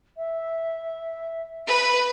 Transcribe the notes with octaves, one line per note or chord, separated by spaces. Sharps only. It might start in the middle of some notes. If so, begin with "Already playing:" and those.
E5
B4